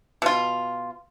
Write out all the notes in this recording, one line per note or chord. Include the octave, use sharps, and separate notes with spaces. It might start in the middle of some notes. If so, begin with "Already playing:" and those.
B2 F4